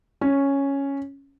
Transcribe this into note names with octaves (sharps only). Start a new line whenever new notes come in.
C#4